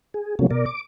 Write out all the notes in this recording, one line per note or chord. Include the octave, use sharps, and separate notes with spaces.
G#4
C3 F3 F#3 A3 A#3 C#4
B2 A#4 D5
D6